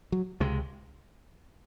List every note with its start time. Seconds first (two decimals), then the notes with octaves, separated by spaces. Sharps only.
0.12 F#3
0.40 C#2 C3 G#3